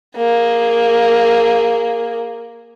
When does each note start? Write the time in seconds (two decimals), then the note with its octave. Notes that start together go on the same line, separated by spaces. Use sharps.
0.16 A#3 G#4